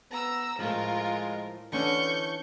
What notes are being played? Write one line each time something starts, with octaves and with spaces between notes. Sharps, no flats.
B3 A#5 E6
A2 F3 G#3 F4 A#4
D3 E3 C#4 D4 C#6 G6